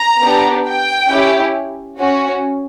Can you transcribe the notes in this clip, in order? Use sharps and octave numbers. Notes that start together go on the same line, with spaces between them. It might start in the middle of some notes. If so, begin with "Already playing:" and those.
Already playing: A#5
B3 D4 G4
G5
C#4 E4 G4
C#4 F#4